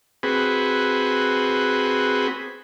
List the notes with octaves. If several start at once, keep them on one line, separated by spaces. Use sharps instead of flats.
C4 F#4 G#4 B4